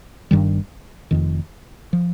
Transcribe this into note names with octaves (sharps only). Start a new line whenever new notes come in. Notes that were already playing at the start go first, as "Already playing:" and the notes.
G1 G2 D#3 G3
F1 F2 D#3
F3